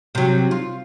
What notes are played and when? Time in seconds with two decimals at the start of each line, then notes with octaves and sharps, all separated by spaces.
0.15 C3 F#3
0.51 F4